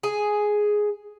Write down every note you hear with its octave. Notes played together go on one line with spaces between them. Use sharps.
G#4